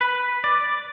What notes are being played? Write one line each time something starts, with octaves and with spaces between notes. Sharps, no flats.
B4
D5